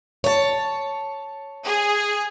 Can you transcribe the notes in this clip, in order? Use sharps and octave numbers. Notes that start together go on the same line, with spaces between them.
C#5 A5
G#4